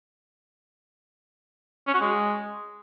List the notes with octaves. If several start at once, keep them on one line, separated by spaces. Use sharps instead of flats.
C#4
F#4
G#3